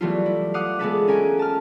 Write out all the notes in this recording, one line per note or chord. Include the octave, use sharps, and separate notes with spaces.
E3 F#3 G3 A3 B3 F4
E4
F5 F#5 D6 D#6 F#6
G#3 B3 A4 B4
C#4 A#4 G#5 D7
A5 F6